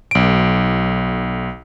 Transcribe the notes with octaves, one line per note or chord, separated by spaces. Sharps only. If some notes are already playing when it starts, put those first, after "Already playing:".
B1 D7